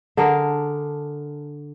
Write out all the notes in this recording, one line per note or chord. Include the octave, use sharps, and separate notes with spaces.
D3 D4 G#4 A#4